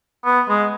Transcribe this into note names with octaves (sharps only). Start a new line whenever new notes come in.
B3
G#3